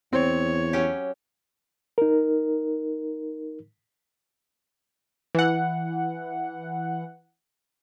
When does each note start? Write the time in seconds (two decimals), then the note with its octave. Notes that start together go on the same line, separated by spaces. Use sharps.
0.13 E2 C4 C#5
0.73 F#3 C#4 G4
1.98 D#4 A#4
5.35 E3 F#5